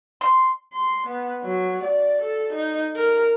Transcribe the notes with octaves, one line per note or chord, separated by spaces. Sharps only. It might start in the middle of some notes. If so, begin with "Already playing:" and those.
C6
C6
B3
F#3
D5
A4
D#4
A#4